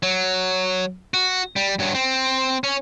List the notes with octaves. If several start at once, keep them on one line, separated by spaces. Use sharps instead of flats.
F#3
F#4
G3
G2 F#3
C4
C#4